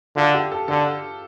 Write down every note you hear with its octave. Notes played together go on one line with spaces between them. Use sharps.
D3 F4
G4
A4
D3 A4